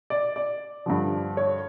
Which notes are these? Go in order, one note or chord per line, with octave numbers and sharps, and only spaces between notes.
D5
D5
G2 D3 F3
C#5